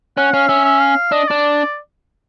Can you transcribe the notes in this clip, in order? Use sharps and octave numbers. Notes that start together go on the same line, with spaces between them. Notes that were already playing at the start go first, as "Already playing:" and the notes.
C#4 F#5
C#4 F5
C#4 E5
E5
F5
D4 D#5
D4 D5